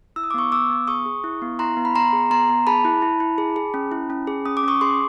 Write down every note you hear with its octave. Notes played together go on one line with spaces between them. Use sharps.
E4 E6
D#6
D6
B3 C#6 D#6
B3 D6 E6
B3
G#4 C#6 D#6
G#4
E4
B3
E4 A#5 C6
B3
B5
B3 A#5 C6
G#4
B3 A#5 C6
B3
G#4 A5 B5
E4
E4
E4
G#4
G#4
C#4
E4
C#4
G#4
C#4 D#6
D6
C#4 C#6 D#6
G#4 C6 D6